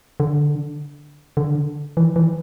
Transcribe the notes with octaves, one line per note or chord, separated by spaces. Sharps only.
D3
D3
E3
E3